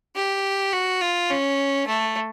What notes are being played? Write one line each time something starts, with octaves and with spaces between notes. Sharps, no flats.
G4
F#4
F4
C#4
A3